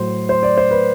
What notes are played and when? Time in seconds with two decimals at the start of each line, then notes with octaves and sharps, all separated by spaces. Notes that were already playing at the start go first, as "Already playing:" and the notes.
Already playing: A2 F#3 C5
0.29 C5
0.43 D5
0.57 C5
0.71 B4